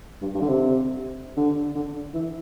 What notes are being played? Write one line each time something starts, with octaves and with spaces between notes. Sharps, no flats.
G2
G2
D3
C3
D3
D3
E3